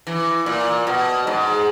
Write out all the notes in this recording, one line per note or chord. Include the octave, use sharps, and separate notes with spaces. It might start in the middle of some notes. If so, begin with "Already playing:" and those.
E3
A#2
B2
G#2